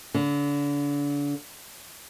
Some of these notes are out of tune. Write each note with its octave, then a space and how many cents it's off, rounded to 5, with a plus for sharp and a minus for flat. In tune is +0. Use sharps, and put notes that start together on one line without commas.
D3 -35